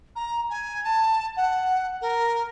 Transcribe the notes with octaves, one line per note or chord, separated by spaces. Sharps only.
A#5
G#5
A5
F#5
A#4